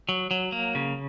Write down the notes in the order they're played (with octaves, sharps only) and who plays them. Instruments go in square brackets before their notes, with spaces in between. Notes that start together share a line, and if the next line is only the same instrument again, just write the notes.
[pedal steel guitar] F#3
F#3
A#3
C#3